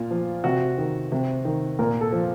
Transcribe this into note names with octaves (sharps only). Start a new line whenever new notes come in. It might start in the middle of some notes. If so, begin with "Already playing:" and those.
Already playing: A#2 F4
F3
C3 F#4
D#3
C3
D#3
A#2 A#4
A4
F3